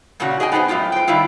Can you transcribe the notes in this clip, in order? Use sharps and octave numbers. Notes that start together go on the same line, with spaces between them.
A#2 C#3 C#4 D4 F#4
G#4 D#5 G5 G#5
B3 D#4 F#4 B4 C5
F#2 A2 B3 F4 G5
C5 G5
D#3 G3 B3 E4 F4